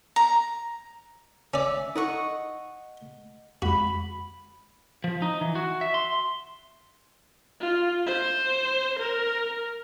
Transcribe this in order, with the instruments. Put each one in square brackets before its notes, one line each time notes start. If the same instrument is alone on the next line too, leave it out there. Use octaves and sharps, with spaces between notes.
[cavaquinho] A#5
[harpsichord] C#4 D5 [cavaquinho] E5 [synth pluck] E6
[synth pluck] D#4 A4 [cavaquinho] D#5 F#5 C#6
[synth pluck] F2 G#3 [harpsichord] F#4 [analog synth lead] B5
[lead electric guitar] F3
D#4
E3
F#4
E5
C6
[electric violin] F4
C5
A#4